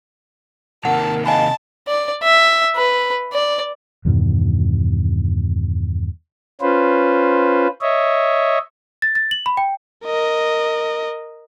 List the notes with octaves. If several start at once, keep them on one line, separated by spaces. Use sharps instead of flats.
C3 D#3 A#3 A#4 F#5 A5
D#5 F5 G#5 A5 B5
D5
E5
B4
D5
E2 G2 B2 D#3
C#4 F4 B4 C5
C#5 D#5 E5
A6
A6
F#7
B5
G5
A#4 D#5